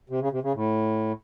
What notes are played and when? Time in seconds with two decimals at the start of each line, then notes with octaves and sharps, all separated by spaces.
0.09 C3
0.21 C#3
0.32 C3
0.43 C#3
0.54 A2